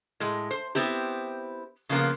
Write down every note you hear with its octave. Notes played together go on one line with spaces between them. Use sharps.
A2 G#3
C5
B3 C4 E4 G4
C#3 F3 A#3 B3